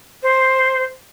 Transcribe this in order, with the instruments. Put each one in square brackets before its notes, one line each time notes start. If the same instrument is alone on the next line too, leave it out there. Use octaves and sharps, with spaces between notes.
[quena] C5